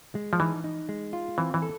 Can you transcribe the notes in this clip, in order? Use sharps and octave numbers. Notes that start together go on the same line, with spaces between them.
G#3
F3
E3 D#4
D#4
G#3
F4
E3 C4
E3
A4